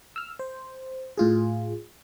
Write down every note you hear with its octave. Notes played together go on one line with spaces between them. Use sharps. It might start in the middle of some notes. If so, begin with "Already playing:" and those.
E6 F6
C5
A2 F4 G#4